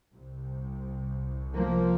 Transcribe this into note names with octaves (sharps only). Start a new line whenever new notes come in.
C2 C3
F3 A#3